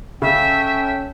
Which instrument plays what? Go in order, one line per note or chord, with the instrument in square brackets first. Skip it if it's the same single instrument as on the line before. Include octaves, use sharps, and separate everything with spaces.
[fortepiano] C#3 [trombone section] C#4 [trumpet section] A4 G5 [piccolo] E5